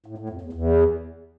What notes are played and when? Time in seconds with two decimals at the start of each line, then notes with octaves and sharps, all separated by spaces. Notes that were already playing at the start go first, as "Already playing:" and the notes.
0.06 A2
0.18 A2
0.30 F2
0.41 E2
0.53 E2